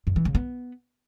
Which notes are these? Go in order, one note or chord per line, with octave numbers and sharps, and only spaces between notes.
F#2
E3
C#3
B3